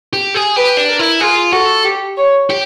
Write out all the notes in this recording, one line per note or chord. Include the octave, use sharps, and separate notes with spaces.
G4
G#4
G4 B4
D4
A#4
E4
F4 G#4
F#4 A4
G4
C#5
G4